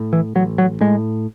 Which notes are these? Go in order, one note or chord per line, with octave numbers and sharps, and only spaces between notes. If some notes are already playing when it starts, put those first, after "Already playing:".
Already playing: A2
E3
A1 F#3
F#3
A2 G#3